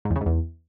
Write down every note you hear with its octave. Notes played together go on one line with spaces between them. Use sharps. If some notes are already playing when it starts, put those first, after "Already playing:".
G#2
E2
C#3
G#2
E2